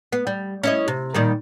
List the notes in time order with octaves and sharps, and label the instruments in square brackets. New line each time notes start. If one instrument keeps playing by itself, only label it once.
[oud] B3
G3
C#4 E4 D#5
C3
A#2 D#3 G3